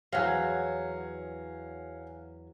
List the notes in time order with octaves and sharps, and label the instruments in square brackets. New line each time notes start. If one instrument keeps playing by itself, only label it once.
[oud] E2 F#3 [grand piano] F5 F#5 G#5